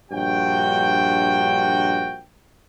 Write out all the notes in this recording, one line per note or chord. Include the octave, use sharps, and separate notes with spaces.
A#1 G2 F#4 G5